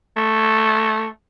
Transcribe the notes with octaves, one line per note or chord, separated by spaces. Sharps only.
A3